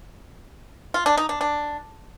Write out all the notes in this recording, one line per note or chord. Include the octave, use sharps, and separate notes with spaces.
F4
D4
D#4
D4
D4